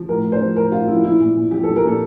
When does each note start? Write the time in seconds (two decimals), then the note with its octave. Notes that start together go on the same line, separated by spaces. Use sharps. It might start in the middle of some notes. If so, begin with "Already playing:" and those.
Already playing: F3
0.09 A2 A#4
0.25 A2
0.32 C5
0.41 F3
0.56 A2 A#4
0.72 A2 F4
0.88 F3 E4
0.96 F4
1.04 A#2 E4
1.20 A#2
1.36 A#2
1.51 F3 G4
1.63 A4
1.68 F3
1.76 A#4
1.83 A#2 A4